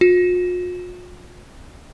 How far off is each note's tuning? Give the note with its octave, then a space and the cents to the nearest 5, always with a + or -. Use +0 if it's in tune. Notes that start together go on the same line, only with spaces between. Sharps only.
F4 +45